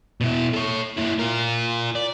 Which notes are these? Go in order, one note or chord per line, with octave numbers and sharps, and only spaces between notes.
B2 E4
A4 C#5
A#3 E4
F4 A#4
D5